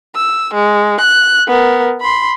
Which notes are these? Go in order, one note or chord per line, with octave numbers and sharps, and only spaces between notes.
E6
G#3
F#6
B3 A#4
B5 C6